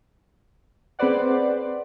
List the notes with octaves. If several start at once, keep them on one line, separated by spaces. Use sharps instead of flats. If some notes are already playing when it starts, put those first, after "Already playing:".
C4 G#4 B4 C5 D5 F#5